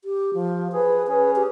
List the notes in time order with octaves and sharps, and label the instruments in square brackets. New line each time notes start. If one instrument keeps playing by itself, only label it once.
[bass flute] G4
F3
[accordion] G#4 [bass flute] B4
[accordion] C#4 G#4 [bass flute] B4
[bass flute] G4